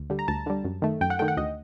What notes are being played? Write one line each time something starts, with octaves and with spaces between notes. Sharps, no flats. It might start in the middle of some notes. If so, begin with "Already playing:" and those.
Already playing: D2
D3 G3
A#5
D2 A5
D3 G3
F#2
D#3 A3
F#2 G5
F#5
D#3 A3 G5
F#5
D2 D#5